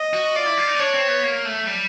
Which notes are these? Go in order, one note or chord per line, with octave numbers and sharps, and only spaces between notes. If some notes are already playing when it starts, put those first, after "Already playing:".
Already playing: D#5
F#4
F4 D5
E4
F4
D#4
C#4
D4 C#5
C4
B3
A#3
A3
G3